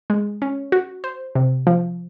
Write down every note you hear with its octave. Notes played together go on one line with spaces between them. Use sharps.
G#3
C#4
F#4
C5
C3
F3